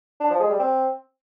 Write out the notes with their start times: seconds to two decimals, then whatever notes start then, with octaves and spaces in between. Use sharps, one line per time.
0.20 D4
0.30 F3
0.40 G#3
0.50 G3
0.60 C4